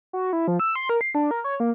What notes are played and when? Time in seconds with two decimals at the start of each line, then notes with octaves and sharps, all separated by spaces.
0.13 F#4
0.33 E4
0.48 F3
0.60 E6
0.76 C6
0.89 A#4
1.01 C7
1.15 D4
1.31 A#4
1.44 C#5
1.60 A#3